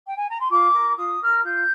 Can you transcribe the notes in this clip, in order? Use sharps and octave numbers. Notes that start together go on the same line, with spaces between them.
G5
G#5
A#5
C6
F4 D6
A#4
F4 D#6
A#4 F6
F4 G6